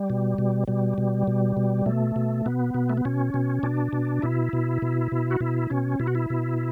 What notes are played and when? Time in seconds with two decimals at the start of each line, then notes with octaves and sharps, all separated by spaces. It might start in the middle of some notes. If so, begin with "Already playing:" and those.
Already playing: G3
0.10 B2
0.38 B2
0.68 B2 G3
0.98 B2
1.27 B2
1.57 B2
1.86 B2 A3
2.16 B2
2.46 B2 B3
2.74 B2
2.90 A3
2.97 B3
3.05 B2 C#4
3.34 B2
3.63 B2 D4
3.93 B2
4.22 B2 E4
4.53 B2
4.82 B2
5.12 B2
5.31 F#4
5.40 B2 E4
5.70 B2 C#4
5.99 B2 E4
6.07 F#4
6.15 E4
6.30 B2